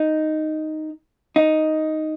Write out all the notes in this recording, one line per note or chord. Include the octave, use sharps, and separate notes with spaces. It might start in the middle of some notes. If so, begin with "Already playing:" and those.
Already playing: D#4
D#4